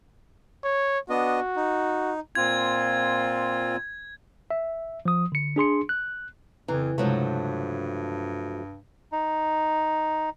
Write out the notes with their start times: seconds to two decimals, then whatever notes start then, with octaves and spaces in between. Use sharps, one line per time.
0.64 C#5
1.10 B3 D4 F#4 D#5
1.56 D#4
2.35 A#2 C4 F4 G#6
4.51 E5
5.05 F3 D#6
5.32 D3 C#7
5.56 D4 G#4 C6 C#7
5.89 F#6
6.68 F2 C#3 E3 B4 A#5
6.98 G2 C3 F3 F#3 G#3 A3
9.12 D#4